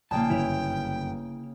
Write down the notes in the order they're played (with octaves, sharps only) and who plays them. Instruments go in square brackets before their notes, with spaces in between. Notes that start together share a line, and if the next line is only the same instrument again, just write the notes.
[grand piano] A#1 A2 [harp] C#3 A#3 [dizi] G5 [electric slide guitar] A5
[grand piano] G1 F#2 [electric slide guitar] E4 C#5